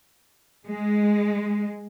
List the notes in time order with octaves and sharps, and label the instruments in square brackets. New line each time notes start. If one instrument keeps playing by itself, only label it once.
[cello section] G#3